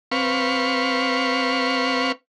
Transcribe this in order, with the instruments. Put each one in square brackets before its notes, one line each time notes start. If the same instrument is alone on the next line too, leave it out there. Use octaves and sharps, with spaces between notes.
[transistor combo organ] C4 B4 F5 C#6